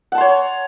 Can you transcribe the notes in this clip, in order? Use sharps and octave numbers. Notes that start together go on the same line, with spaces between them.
C#5 F#5 A5 C6